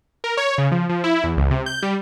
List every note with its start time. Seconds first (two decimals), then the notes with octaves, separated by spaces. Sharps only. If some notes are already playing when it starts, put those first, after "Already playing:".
0.24 A#4
0.37 C#5
0.58 C#3
0.72 F3
0.89 F3
1.04 E4
1.24 E2
1.37 C#2
1.51 C3
1.66 G6
1.83 G3